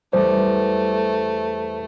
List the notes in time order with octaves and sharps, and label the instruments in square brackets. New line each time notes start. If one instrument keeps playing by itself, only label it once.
[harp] E2 G3 [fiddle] A3 [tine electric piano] C5